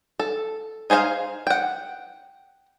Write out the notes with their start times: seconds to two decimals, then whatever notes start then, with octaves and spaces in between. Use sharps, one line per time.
0.20 A4
0.90 D#4 G#4 C5 D#5 F5
1.47 F#5 G5